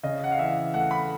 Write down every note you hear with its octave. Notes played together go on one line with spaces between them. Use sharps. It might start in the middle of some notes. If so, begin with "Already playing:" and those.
C#3 D#5
F#5
F5
E3 E5
A3 F#5
B5